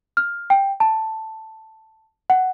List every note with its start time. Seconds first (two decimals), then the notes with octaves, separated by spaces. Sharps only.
0.17 F6
0.50 G5
0.80 A5
2.30 F#5